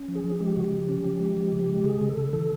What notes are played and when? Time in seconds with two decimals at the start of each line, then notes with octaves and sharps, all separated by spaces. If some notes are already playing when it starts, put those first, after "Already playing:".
Already playing: C#4
0.08 F3
0.15 G#4
0.24 F3
0.40 G#3 G4
0.56 C#3 F#4
0.64 G4
0.72 F3
0.89 C#4
1.05 F3
1.20 G#3
1.37 F3
1.52 C#3
1.69 G#3
1.84 C#3 G#4
2.01 C#3
2.09 A4
2.17 C#3
2.33 E3 A4